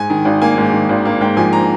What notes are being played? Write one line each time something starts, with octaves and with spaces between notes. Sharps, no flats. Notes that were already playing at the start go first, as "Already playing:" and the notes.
Already playing: G#2 G#5
D#3
G#1
A#3 G#5
G#2
D#3
G#1
A#3
G#2 G5
F3 G#5
A#5